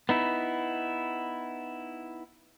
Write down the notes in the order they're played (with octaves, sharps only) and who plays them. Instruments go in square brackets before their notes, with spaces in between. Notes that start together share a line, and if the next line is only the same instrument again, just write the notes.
[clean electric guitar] B3 D#4 E4